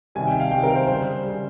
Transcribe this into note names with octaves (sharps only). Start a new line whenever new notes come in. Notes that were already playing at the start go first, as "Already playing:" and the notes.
C3 D#3 G3 G#5
G5
F5
C3 D#3 G3 G5
A#4
C5
C#3 G3 C5
C#3 G3